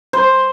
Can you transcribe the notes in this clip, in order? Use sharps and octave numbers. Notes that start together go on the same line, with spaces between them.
C5